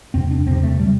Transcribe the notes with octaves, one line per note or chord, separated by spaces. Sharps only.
E2 C3 C4
D4
E2 C3 C4
A3
C3 G3